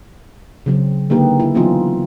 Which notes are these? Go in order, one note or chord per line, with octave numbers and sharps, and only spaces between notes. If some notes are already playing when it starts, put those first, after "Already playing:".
C#3 F#3 C4
D3 G#3 A#3 D#4 G4 B4
E4
E3 F#3 B3 C#4 D#4 F4